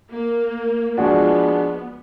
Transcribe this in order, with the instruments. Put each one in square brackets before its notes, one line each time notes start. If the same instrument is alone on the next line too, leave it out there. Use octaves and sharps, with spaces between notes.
[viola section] A#3
[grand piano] F3 G#3 D4 F#4 [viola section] B3